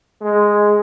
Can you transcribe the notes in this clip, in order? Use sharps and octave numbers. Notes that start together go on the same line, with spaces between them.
G#3